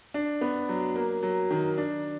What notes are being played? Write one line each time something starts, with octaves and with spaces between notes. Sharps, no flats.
D4
B3
F#3
A#3
F#3
D#3
D4